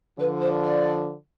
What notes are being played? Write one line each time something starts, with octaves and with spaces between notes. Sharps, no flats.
D3 F3 B4
C5
D5